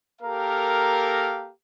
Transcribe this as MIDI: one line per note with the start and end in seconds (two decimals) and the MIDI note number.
0.22 1.50 58
0.22 1.50 67
0.22 1.50 69
0.22 1.50 70
0.22 1.50 77
0.22 1.50 82